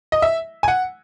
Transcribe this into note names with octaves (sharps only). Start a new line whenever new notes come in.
D#5
E5
G#5
F#5